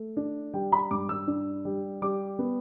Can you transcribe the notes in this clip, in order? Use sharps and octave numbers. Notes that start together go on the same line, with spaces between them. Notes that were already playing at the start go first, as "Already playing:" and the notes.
Already playing: A3
D4
G3 G5
B5
G2 D6
E6
D4
G3
G3 D6
B3